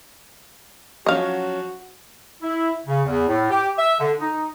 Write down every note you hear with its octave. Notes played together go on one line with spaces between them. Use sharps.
F3 F#3 C#4 F#4 D#5 F5
E4
C#3
E2
A2
G4
E5
D3
D#4